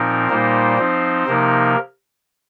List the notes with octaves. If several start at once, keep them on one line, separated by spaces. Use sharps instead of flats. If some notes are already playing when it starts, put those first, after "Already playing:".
Already playing: A#2 F3 C4 D#4 A#4
A#2 G3 A#3 D#4 C5
F3 C4 D#4
C3 F3 A#3 D#4 A#4